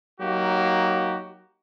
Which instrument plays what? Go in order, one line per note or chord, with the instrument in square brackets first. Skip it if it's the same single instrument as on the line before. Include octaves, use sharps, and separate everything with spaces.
[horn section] F#3 A#3 D#4 F#4 G4